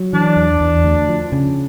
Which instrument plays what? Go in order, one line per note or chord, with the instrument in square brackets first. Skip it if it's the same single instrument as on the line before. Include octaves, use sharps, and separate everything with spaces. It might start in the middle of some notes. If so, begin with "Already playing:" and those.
Already playing: [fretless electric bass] F#3
[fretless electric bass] E3 [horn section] D4
[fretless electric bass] E2
E2
D2
F3
C#3